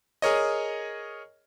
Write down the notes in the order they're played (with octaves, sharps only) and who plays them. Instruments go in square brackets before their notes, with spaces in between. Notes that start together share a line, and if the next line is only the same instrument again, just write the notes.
[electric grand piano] G#4 A#4 C#5 D#5